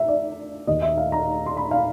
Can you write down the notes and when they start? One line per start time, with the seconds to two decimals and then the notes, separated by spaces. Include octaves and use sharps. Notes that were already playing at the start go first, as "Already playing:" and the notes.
Already playing: E5
0.08 D5
0.67 D#2 D#3 D#5
0.82 E5
0.98 F5
1.12 A#5
1.46 C6
1.57 B5
1.71 F5